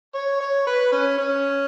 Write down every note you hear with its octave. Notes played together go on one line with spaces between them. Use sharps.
C#5
C#5
B4
C#4
C#4